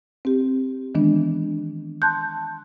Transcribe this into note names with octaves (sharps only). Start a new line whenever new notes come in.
C4 G4
D#3 E3 G#3 B3 D4
A5 C6 F#6 G6